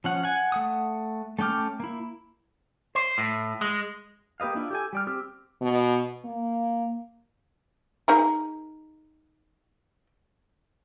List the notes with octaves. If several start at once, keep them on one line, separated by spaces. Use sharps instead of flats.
F3 C#4 F#5
F#5 G#5
A3 F#5 D#6
A3 C#4 G5 D6 F6
A#3 E4
C5
A2
G#3
A#3 G4 B4 D#5 F5
D4 E4 F4
G4 A4 G#5
G3 D5 F6
C4 G4 D6 E6 F6
B2
A#3
D#4 G#4 A#4